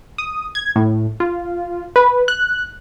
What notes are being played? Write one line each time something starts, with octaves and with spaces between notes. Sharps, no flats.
D#6
G#6
A2
F4
B4
F#6